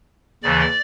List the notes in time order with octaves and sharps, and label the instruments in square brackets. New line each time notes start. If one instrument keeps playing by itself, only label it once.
[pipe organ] D#2 C#3 E3 D5